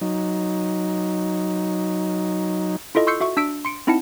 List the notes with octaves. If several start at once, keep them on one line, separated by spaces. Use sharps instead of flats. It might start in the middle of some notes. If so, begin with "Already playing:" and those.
F#3 D#4
E4 F4 A4 D#5
C6 C#6 E6 G6 C7 C#7
F#4 E5 C#6
D4 E6 B6 D7
C6 C#7 D7
C4 D#4 E4 F#5 A5 C#7